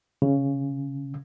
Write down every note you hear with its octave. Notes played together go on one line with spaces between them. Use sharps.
C#3